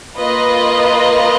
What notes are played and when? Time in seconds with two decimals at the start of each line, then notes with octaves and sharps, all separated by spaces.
0.18 A#3 F4 B4 D#5